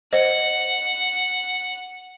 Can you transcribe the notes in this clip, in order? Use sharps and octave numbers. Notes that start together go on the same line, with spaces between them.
C5 D#5 F#5